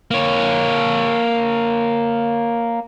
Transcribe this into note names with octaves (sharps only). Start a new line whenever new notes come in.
A#3 C#5